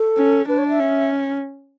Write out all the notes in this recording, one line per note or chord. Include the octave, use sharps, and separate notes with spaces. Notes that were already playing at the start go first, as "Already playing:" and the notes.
Already playing: A4
C#4
D4 B4
C#5
E5
C#4